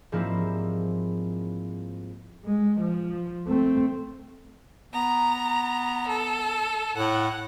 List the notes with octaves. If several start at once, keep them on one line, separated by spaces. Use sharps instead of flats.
G#2 F3 G3 A#3 C4 E4
G#3
F3
A3 C4
B3 A#5
A4
A2 F#5